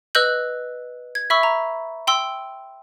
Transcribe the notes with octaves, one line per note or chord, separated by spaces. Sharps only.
B4 D#5 E6 F#6 G6 F#7
G#6
E5 B5 C#6 E6
A#5
G5 C6 E6